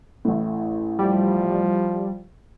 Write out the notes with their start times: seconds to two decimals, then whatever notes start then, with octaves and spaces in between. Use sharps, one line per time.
0.25 A1 A2
0.99 F3 G3